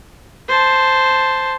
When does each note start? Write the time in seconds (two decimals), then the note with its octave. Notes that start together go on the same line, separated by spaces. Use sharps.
0.48 C5 A5